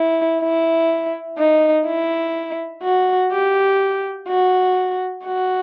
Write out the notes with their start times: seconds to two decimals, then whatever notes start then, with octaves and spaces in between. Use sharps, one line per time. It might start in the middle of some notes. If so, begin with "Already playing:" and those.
Already playing: E4
0.42 E4
1.38 D#4
1.86 E4
2.83 F#4
3.32 G4
4.28 F#4
5.25 F#4